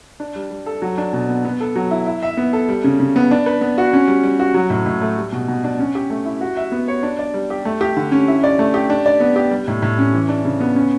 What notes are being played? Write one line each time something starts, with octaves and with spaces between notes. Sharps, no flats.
D4
G3
G3
A4
F#3
D4
B2
B3
B3
A4
F#3
E4
E4
E5
B3
A4
G3
C#3
C#3
B3
D4
B4
B3
F#4
C#4
G3
G3
F#4
F#3
A2
A2
A3
G3
B2
B2
D4
C#4
G4
A3
E4
F#4
E5
B3
C#5
D4
D5
G3
G4
A3
G4
D3
C#4
E4
D5
A3
G4
D4
D5
B3
G4
G3
A2
A2
C#4
E3
D4
C#3
B3
C#4